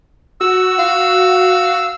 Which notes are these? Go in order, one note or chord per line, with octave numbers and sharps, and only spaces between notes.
F#4 E6
F5